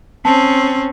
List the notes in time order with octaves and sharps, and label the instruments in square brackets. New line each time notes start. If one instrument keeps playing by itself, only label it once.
[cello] C4 C#4 [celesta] A5